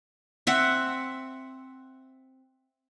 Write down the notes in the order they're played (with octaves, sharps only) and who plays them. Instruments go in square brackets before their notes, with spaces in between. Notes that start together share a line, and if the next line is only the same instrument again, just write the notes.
[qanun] C4 E5 F#5